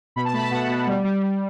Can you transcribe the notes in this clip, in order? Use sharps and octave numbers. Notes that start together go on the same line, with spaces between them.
B2 B5
A5
A3 B5
A5
B2 F#5
B2
G3
G3
G3